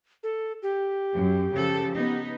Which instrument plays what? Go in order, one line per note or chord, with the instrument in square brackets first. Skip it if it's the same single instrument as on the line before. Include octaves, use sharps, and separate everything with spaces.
[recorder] A4
G4
[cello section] F#2
C#3 F3 A4
B3 D#4